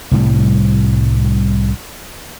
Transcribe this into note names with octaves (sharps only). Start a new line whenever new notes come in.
C2 A2 G3